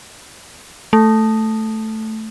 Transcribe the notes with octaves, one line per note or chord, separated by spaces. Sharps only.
A3